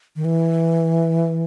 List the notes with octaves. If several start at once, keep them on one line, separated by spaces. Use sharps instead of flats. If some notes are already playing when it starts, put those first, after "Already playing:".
D#3
E3